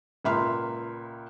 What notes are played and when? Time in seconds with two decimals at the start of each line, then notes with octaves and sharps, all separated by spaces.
0.24 C#2 A#2 E5 B5 C6 F6